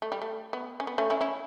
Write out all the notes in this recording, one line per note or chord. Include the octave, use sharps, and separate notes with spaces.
A3
G3
A3
B3
C#4
B3
A3 C#4
C#4 E4
C#4 E4